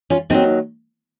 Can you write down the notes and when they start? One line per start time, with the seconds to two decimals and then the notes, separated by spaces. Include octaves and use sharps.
0.10 C#4 F4
0.30 D#2 D#3 F#3 C4 D#4